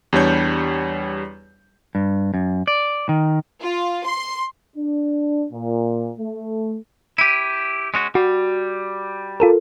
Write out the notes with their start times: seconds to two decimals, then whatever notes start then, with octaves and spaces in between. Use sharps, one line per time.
0.13 E2 G3 D4 C#5 G6
1.95 G2
2.34 F#2
2.67 D5
3.09 D#3
3.62 F4
4.05 C6
4.76 D4
5.51 A#2
6.19 A3
7.18 E4 G4 D#7
7.94 G#3 C#4 F#4
8.15 G3 F#4
9.40 F4 A4 A#4